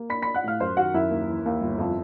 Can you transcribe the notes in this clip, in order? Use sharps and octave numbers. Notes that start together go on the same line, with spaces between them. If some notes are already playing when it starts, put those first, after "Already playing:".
Already playing: A#3
D4 B5 B6
D4 B5 B6
F#5 F#6
A2 F5 F6
F#2 C5 C6
D#3 F#4 F#5
F#2 E4 E5
D#2
E3
D#2
G1
F2